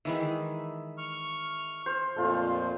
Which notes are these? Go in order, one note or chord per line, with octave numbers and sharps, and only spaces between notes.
D#3 E3 G#3 E5
C#6 F6
C5
F2 A#2 A3 F4 C5